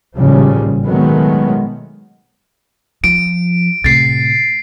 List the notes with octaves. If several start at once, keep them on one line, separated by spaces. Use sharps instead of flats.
A1 D#2 G#2 C#3 F3 G3
B2 D#3 F#3 G#3 A3 B3
F3 D7
A2 C3 A6 C7